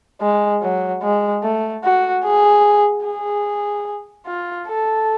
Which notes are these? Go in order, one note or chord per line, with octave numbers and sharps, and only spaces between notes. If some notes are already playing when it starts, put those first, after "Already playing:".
G#3
F#3
G#3
A3
F#4
G#4
G#4
F4
A4